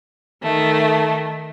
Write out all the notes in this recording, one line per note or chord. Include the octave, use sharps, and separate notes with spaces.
D#3 A3